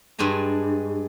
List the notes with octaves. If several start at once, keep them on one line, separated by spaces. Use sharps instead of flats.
G2 G#3 D4 G#5 A#5